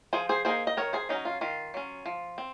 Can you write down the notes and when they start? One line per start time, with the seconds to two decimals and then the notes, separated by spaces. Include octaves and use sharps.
0.13 F3 G#4 C5
0.29 G#4 C5
0.45 A#3 D#4 G#4 C5
0.67 D#5
0.77 D#3 A#4 C#5
0.93 G#4 C5
1.09 F#3 C#4 D#4
1.25 F4
1.41 D#3 F4
1.74 F#3 C#4
2.06 F3
2.38 C4